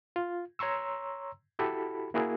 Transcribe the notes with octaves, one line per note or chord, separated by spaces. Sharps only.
F4
C#5 A#5 C6 C#6 E6
E4 F#4 G4 A4 B5
A#3 E4 F#4 G#4 A#4